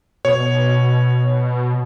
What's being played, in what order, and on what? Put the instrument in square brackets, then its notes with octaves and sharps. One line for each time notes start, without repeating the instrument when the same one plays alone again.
[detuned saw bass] B2 [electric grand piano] C#5